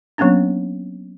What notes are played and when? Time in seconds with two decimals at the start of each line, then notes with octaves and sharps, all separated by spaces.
0.18 F#3 A#3 B3 C#4 D4